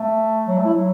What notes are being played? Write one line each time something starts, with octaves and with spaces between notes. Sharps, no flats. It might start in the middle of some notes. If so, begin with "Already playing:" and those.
Already playing: A3
F#3
A3
E4
F#3